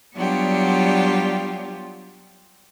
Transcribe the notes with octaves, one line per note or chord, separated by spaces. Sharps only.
F#3 G3 B3 D4 F4 G4